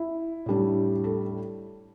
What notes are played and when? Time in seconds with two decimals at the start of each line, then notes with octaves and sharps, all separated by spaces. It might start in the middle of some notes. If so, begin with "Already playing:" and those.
Already playing: E4
0.46 A2 G3 D4
1.04 A4